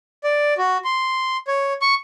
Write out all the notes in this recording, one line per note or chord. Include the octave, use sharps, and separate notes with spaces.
D5
F#4
C6
C#5
C#6